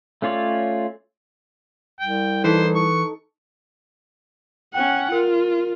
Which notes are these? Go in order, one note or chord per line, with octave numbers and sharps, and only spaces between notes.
A3 C#4 F4 C#5 D5
C2 G5
E3 D#4 A4 C5
C#6
C#4 F#5 G5 F#6
F4 A#4